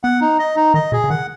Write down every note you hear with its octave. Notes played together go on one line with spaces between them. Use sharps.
B3 F#5
D#4
D#5
D#4
D#3 D#5
B2 G#4
C#3
D#3 F#5